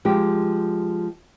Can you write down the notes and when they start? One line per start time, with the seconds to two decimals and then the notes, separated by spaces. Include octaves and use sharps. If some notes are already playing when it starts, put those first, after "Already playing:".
0.05 F3 G#3 G4